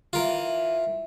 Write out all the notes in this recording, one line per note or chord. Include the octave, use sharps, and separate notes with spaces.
E3 F4 A#4